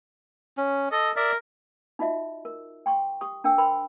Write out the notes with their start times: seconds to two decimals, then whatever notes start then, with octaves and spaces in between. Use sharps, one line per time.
0.57 C#4
0.92 A4 D#5
1.16 A#4 D5 E5
1.99 D#4 F4 F#4 D#5 E5
2.45 A#4
2.86 G5 C6 C#6
3.21 G4 C#6 D#6
3.44 D4 A#4 G5 E6
3.58 A#4 C5 G5 B5 C6